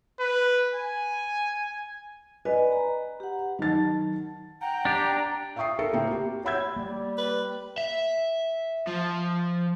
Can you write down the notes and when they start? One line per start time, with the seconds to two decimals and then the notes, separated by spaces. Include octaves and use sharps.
0.20 B4
0.75 G#5
2.45 B4 D5 D#5 G#5
2.72 A#5
3.20 G4 F#5
3.59 D#3 F#3 A5 A6
4.61 F#5 G5 A#5
4.85 D4 G4
5.56 E5 F5 G5 C#6 D#6 C7
5.79 A4 A#4 E5 C#7
5.93 A2 A#3 C4 G5
6.08 F#4 G4
6.45 C#5 F#5 B5 E6 G6 G#6
6.76 G3 A#3 D5
7.18 B4
7.78 E5
8.87 F3